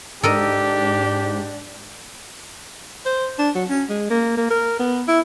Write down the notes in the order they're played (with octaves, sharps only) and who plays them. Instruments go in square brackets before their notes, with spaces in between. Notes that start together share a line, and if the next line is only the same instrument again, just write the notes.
[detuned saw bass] G#2 [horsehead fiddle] D4 [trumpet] G4 [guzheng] A4 A#4 D#5
[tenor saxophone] C5
D4
F#3
C#4
G#3
A#3
A#3
A#4
B3
E4